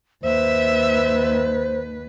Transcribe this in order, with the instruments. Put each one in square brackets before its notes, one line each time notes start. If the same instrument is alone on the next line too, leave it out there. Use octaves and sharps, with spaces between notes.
[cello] D#2 B4 [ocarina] C5 [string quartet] E5